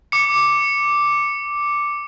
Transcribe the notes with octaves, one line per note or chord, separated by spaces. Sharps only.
D6 C#7